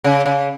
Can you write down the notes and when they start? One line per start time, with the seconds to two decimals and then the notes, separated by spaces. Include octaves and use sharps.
0.04 C#3
0.26 C#3